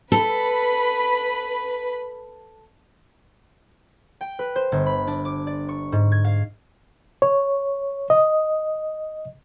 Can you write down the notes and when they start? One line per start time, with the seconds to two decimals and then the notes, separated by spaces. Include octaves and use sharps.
0.12 A4 B4 B5
4.21 G5
4.39 B4
4.56 C5
4.72 G1
4.86 B5
5.07 D4
5.25 D6
5.47 D5
5.69 C#6
5.92 G#2
6.12 G#6
6.25 F5
7.22 C#5
8.10 D#5